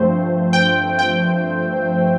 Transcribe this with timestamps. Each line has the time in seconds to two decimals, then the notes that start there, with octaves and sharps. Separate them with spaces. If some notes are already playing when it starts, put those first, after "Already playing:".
Already playing: G2 F3 A3 C4 C5
0.53 G5
0.99 G5